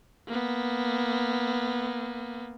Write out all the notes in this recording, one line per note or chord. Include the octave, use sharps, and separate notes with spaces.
A#3 B3